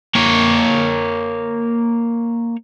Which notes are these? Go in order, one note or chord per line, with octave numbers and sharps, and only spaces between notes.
A#3 C#5